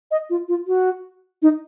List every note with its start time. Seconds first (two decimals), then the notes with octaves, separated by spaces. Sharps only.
0.11 D#5
0.30 F4
0.48 F4
0.67 F#4
1.42 D#4